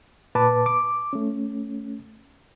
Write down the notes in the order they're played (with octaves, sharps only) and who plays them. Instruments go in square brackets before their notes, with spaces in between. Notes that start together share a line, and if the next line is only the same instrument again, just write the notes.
[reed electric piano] A#2 B4 A5 D6
D6
A3 C#4